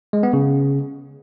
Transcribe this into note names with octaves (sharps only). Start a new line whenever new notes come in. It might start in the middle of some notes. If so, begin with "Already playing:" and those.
G#3
B3
C#3